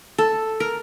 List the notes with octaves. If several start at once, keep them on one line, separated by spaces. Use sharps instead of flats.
A4
A#4